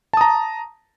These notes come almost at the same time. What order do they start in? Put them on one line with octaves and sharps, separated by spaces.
A5 D#6 A#5